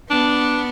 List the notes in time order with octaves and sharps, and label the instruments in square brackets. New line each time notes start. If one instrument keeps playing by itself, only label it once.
[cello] B3 [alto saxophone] D4